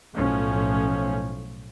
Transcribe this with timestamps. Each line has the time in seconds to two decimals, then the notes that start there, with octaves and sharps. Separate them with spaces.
0.15 B1 A2 F3 C#4